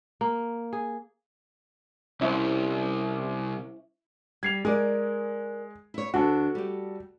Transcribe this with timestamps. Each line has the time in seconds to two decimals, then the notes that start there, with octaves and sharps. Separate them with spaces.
0.21 A#3
0.73 G#4
2.21 C2 C#4 E4 C5
4.43 G3 G#6 C7 F7
4.65 G#3 G#4 A#4 D5
5.94 E4 C#5
6.14 D2 D4 F#4 A4
6.55 G3 G4